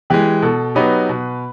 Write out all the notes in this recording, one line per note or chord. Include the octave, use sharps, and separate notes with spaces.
E3 G#3 G4
B2 A4
F#3 B3 D#4 G4 B4
B2